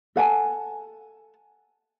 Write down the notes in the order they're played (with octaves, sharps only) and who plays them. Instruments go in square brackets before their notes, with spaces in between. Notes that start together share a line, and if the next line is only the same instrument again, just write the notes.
[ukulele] A4 F#5 G#5 A5